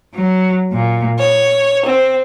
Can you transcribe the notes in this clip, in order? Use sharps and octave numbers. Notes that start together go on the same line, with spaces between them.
F#3
A#2
C#5
C4